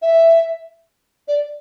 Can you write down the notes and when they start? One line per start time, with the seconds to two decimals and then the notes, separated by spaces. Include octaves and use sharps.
0.02 E5
1.28 D5